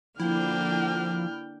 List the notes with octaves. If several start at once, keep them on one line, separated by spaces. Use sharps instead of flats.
D3 F3 A#3 D4 E4 G5 F6